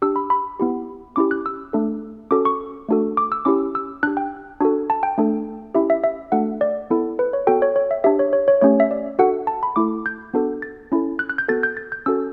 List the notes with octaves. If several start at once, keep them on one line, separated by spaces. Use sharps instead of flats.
D4 G4 E6
B5
B5
B3 E4 G4
C#4 E4 G4 D6
F#6
E6
A3 D4 A4
C#4 F#4 A4 D6
C#6
A3 D4 F#4 A4
D6
E6
C#4 E4 G4 D6
E6
D4 G4 F#6
G5
D4 F#4 A4
A5
G5
A3 D4 A4
C#4 E4 G4 E5
E5
E5
A3 D4 F#4 A4 F#5
D5
B3 E4 A4
B4
C#5
B3 F#4 A4 G5
C#5
C#5
E5
D4 G4 E5
C#5
C#5
C#5
A3 C#4 G4 C#5
E5
D5
D4 F#4 A4 F#5
A5
B5
A3 E4 A4 D6
G6
B3 D4 F#4 A4
A6
C#4 E4 A4
F#6
F#6
G6
B3 F#4 A4 A6
G6
A6
G6
C#4 F#4 A4 E6